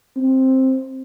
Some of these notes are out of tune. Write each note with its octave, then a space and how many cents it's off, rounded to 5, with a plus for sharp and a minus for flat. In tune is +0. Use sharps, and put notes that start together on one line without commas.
C4 +10